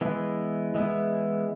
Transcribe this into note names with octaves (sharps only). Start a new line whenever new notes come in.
E3 G#3 B3 E4
E3 G#3 B3 E4